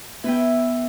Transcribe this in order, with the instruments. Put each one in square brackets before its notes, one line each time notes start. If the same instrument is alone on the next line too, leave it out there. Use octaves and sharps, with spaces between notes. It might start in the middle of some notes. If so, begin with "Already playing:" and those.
[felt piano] B3 [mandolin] E4 B4 E5 G5